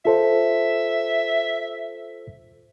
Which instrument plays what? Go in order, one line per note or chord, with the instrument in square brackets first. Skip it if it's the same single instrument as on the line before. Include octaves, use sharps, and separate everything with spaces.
[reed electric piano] F4 A4 C5 [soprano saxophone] E5